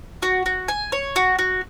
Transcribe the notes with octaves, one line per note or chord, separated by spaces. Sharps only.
F#4
F#4
G#5
C#5
F#4
F#4